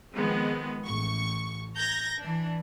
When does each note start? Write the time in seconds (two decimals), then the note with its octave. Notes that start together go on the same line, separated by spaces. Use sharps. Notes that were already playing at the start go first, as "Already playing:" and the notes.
0.14 D#3 F3 G#3 B3 C4
0.85 A1 C#6
1.75 A#5 G6 G#6 A#6
2.19 E3 D4